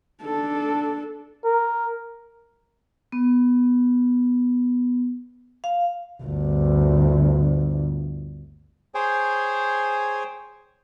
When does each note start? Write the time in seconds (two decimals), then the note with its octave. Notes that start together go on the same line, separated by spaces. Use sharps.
0.22 D4 A4
1.45 A#4
3.12 B3
5.64 F5
6.24 G1 D2
8.95 G#4 C5 C#5 G5 G#5